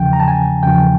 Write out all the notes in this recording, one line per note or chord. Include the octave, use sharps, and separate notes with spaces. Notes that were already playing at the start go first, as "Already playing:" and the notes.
Already playing: E2 C#3 F3 G5
A#5
A5
G#5
E2 C#3 F3 G5